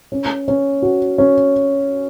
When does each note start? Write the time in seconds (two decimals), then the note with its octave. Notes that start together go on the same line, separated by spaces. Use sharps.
0.12 C#4
0.48 C#4
0.82 F#4
1.18 C#4